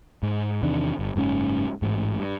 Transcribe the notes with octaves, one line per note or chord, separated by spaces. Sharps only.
G#2
E2 C3 D#3 D4
G1
F#1 G#2 C4 C#4
A1 G#2
G2